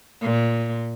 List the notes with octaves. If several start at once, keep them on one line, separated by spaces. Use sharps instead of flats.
A#2